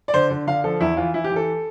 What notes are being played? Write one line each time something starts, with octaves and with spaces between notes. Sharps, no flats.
D5
D3 C5
D3
D3 F5
F3 A4
E2 E4
E3 F4
E3 E4
G4
E3
A4